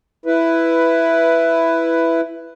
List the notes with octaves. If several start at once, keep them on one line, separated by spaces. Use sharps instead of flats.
E4 B4